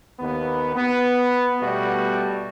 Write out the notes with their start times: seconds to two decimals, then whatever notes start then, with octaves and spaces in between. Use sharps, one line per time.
0.19 D#2 B3
0.75 B3
1.61 B2 G3 A3 B3 F#4